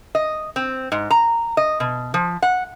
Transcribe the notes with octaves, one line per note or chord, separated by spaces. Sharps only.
D#5
C4
G#2
A#5
D#5
B2
F3
F#5